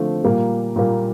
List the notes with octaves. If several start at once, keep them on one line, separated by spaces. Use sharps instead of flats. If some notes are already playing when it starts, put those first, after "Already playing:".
Already playing: D3 F3 A3 C4
A#2 G3 A#3
A#2 G3 A#3